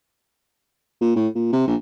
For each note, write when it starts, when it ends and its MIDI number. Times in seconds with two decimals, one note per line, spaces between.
1.01 1.11 46
1.16 1.28 45
1.35 1.48 46
1.52 1.63 48
1.67 1.75 34